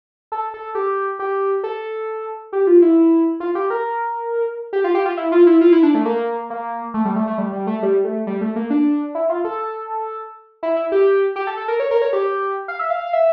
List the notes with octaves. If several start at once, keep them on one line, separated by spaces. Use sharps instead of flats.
A4
A4
G4
G4
A4
G4
F4
E4
F4
G4
A#4
G4
F4
G4
F4
E4
F4
E4
F4
E4
D4
A3
A#3
A#3
A3
G3
A3
A3
G3
G3
A3
G3
A3
G3
A3
A#3
D4
E4
F4
A4
E4
E4
G4
G4
A4
A4
A#4
C#5
A#4
C#5
G4
F5
E5
F5
F5
E5